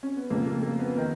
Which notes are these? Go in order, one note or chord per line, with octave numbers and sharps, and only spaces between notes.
C#4
B3
F2 C#3 A#3
A#3
A#3
B3
D#3 A#4